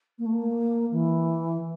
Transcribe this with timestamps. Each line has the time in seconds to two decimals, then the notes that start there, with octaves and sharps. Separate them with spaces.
0.18 A#3
0.25 A3
0.32 A#3
0.91 E3